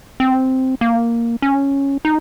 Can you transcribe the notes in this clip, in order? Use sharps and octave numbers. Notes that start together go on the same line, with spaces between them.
C4
A#3
C#4
D#4